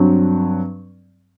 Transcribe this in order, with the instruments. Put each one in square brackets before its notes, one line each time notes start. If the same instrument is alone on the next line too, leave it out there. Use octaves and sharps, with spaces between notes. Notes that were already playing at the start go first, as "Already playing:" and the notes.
Already playing: [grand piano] G2 F#3 C4